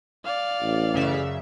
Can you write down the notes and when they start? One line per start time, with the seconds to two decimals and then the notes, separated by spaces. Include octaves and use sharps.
0.24 D5 F5
0.60 A1
0.94 F#2 C#3 E5